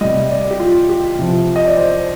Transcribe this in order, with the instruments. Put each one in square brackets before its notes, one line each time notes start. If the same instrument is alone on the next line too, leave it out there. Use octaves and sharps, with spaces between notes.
[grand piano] C3 G3 D#5
D5
G4
F4
G4
C3 F3
D#5
D5
C5